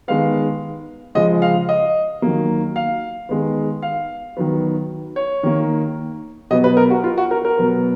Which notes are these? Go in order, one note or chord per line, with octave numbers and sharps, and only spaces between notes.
D#3 G#3 B3 F5
C#3 F3 G#3 D#5
F5
D#5
D#3 F#3 A#3
F5
D#3 G#3 B3
F5
D#3 F#3 B3
C#5
D#3 A#3
B2 F#3 B3 D#5
B4
A#4
F#4
F4
F#4
A#4
A#4
B2 F#3 B3